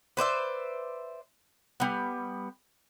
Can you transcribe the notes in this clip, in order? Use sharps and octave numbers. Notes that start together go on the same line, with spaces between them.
B4 C5 D5 E5
G3 B3